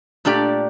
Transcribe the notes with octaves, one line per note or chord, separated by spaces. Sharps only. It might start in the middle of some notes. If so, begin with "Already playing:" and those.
A#2 A3 D4 G4 D5